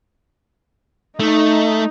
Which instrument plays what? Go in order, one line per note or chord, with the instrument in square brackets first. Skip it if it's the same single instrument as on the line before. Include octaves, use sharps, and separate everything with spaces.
[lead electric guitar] A3 [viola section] D#4